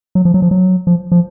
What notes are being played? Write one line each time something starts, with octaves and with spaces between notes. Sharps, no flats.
F#3
F3
F#3
F3
F#3
F3
F3